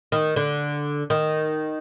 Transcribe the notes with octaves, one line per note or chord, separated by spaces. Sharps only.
D#3
D3
D#3